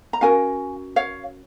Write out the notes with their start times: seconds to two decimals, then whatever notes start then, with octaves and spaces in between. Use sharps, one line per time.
0.13 A#5
0.21 C#4 F#4 A#4 F5 G#5
0.96 C#5 F5